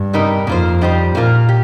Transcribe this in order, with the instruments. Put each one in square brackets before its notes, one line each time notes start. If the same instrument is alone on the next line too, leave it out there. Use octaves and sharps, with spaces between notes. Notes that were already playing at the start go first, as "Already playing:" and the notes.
Already playing: [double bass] G2
[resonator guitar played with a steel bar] C3 G3 D#4 A#4
[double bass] F2 [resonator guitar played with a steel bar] A#3 F4 C5
[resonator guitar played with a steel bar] G3 D#4 G4 C5
[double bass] A#2 [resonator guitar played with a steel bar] A#3 F4 A#4
[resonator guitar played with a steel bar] G4